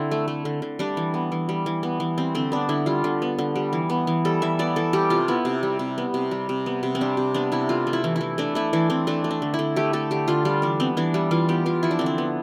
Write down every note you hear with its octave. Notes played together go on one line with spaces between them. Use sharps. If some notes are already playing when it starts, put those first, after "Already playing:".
Already playing: D3 C4 E4
A3
A3
D3
D3
G3 D4
E3
B3
E3
G3
E3
B3
E3
G3 C4
D3 C4
B3 D4
D3 E4
G3 F4
D3
B3
D3
G3
E3
B3
E3
G3 A4
E3 E5
B3 D5
E3 A4
G3 G4
C3 F4
B3 E4
C3
G3
C3
B3
C3
G3
C3
B3
C3
C4
G3 D4
C3
B3 D4
C3 E4
A3 F4
A3
E4
E3
E3 E4
A3 D4
A3 E4
E3 D4
E3 C4
A3 D4
A3
D4
D3
E4
D3
A3 G4
A3 A4
D3 G4
D3 F4
G3 F4
E3 D4
B3 C4
E3 D4
G3 E4
E3 F4
B3 G4
E3 F4
F3 E4
D4
D3 C4
D4
B3